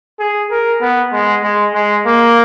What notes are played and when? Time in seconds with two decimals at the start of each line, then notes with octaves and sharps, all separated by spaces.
0.20 G#4
0.51 A#4
0.81 B3
1.13 G#3
1.43 G#3
1.75 G#3
2.06 A#3